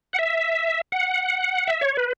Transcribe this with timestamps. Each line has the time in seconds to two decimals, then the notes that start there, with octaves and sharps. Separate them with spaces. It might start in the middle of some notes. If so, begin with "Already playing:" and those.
0.13 F#5
0.19 E5
0.92 F#5
1.67 E5
1.81 C#5
1.97 B4